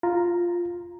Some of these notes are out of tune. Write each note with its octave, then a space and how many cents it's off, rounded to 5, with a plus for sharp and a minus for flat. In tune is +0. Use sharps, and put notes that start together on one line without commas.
F4 +0 A#5 +0